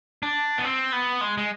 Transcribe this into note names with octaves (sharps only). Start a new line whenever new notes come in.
D4
B3
C4
B3
G#3
G#3